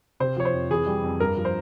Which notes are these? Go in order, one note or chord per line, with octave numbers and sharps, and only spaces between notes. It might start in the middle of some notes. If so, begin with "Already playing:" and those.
C3 C5
F3 C#5
C5
F2
E3 G#4
G3
F2
G2 A#4
F3
C5